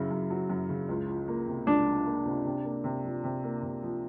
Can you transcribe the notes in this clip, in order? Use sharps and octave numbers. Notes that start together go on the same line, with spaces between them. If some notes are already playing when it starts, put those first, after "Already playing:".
Already playing: F#2 C#3 F#3 E4
F#2
F#3
F#2
C#3
C#2
F3
A#3
C3
C#2 D4
F3
A#3
C3
C3
A#3
C3
F3
C3
A#3
C3
F3